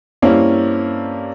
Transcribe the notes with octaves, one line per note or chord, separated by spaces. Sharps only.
G2 A#3 C4 C#4 E4